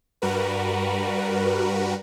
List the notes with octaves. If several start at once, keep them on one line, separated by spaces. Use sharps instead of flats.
G2 G3 F#4 A#4 B4